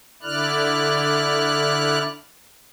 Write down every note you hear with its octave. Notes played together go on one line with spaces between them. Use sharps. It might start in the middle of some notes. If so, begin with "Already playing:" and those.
D3 E4 D5 F6 F#6